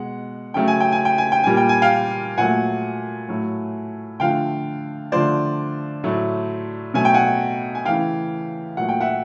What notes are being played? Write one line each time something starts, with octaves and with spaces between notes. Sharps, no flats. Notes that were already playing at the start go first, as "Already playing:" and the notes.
Already playing: B2 G#3 F#5
C#3 F#3 A3 G5
G#5
G5
G#5
G5
G#5
G5
A#2 G3 G#5
G5
G#5
F5 G5
A#2 F#3 A3 F#5 G#5
A2 F#3 A3
D3 F3 A3 F5 G5
D3 F3 A3 C5 D5
A2 F#3 A3
B2 F#3 A3 G#5
G5
F#5 G#5
G#5
C#3 E3 A3 F5 G5
A#2 F#3 A3 F#5
G5
E5 F#5